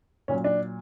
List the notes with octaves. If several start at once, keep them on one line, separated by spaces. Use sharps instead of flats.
A#2 F#3 C#4
D4